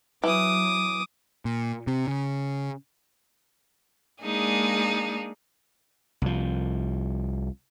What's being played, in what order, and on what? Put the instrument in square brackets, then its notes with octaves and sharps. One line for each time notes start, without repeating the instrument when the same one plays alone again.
[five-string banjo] E3 [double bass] F#3 [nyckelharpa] D6 D#6
[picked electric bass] A#2
C3
C#3
[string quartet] G#3 A#3 D4 D#4 G#4
[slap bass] C2 F3